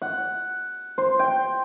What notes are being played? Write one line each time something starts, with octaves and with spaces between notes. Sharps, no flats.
F#5
C5
G5